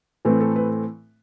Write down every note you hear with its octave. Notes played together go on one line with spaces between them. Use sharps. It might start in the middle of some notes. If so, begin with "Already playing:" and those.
A2 E3 A3 C4 B4
A4
B4